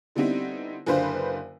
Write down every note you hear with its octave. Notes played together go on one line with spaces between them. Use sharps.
D3 G3 B3 C4 D#4 E4
F#1 D3 B4 C5 F5